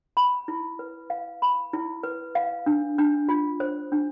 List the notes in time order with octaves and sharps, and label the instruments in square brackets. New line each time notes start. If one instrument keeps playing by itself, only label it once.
[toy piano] B5
E4
B4
F5
B5
E4
B4
F5
D4
D4
F4
C5
D4